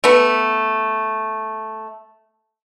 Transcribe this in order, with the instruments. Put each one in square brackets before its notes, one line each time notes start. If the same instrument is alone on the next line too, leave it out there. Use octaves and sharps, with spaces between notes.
[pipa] A3 B3